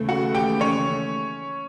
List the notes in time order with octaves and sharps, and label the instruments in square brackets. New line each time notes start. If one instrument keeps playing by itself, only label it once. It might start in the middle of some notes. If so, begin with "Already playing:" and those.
Already playing: [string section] D#2 C#3 E3 A3
[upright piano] F#4 F#5
G4 G5
C#4 C#5